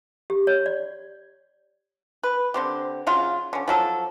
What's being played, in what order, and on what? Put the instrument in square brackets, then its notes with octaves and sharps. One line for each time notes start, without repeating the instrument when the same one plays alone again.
[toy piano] G4
C#5
D5
[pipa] B4
D3 C4 G4
C#3 F#3 F4
D3 C#4
F3 F#3 A4